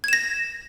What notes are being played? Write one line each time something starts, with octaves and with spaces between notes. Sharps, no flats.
G#6 A#6 E7